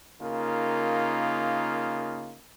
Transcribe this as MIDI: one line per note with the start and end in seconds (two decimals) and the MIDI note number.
0.21 2.37 49
0.21 2.37 58
0.21 2.37 63
0.21 2.37 65
0.21 2.37 70